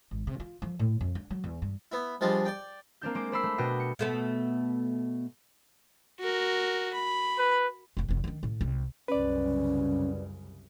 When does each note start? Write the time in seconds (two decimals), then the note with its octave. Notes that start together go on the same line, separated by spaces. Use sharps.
0.11 G#1
0.27 C3
0.40 F4
0.62 F3
0.79 A2
1.01 F2
1.15 D4
1.31 F#3
1.44 E2
1.62 G2
1.92 B3 E4
2.21 F3 G3 G#3 D4
2.45 D5 G5
3.02 A#3 C4 D4 G6
3.15 G#3 C5 D6
3.32 C5 D5 B5 C6 E6 C7
3.43 A3
3.58 B2 D4 F#4 D#5 G5
3.80 C#7
3.99 B2 A3 B3
6.20 F#4 A#4
6.94 B5
7.38 B4
7.97 F1 E2
8.09 F1 E2
8.24 D#3 D4
8.43 A2
8.61 C2 G#3
9.08 C2 F#2 C#3 C#4 B4 D5